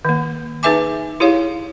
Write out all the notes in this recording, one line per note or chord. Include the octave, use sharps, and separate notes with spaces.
D#3 A#3
D#4 G#4 B4 E5 G#5 D6
E4 G4 G#4 C#5 F5